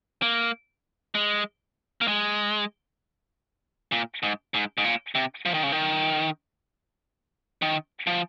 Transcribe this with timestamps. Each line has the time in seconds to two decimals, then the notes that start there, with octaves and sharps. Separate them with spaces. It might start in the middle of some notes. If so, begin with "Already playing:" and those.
0.22 A#3
1.15 G#3
2.01 A#3
2.08 G#3
3.92 A#2
4.23 G#2
4.54 G#2
4.78 G#2
4.84 A#2
5.15 C3
5.45 F3
5.54 D#3
5.63 C#3
5.72 D#3
7.62 D#3
8.07 F3